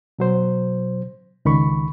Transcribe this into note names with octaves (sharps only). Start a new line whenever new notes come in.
B2 F#3 C5
C#2 D#3 B5 C#6